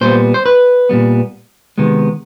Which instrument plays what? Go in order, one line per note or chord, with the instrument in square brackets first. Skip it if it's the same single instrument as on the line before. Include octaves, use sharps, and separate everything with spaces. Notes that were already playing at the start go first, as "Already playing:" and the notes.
[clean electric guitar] A#2 G3 B3 C5
C5
B4
A#2 G3 B3
C3 D#3 G#3 B3